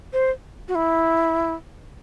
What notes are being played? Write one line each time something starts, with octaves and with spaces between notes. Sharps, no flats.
C5
F#4
E4